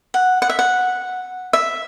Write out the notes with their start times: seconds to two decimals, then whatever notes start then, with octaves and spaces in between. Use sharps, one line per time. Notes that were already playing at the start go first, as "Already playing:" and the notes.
0.14 F#5
0.42 F#5
0.49 E5
0.59 F#5
1.53 E5